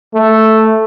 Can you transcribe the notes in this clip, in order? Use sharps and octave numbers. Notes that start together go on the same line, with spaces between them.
A3